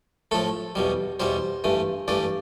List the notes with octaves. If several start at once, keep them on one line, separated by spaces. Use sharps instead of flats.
A2 F3 A3 A4
E2 B2 G3
E2 B2 G3 C5
G2 E3 A3
G2 E3 A3 D5